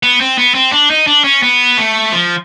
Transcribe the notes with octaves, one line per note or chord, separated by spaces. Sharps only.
B3
C4
B3
C4
D4
D#4
D4
C#4
B3
A3
F3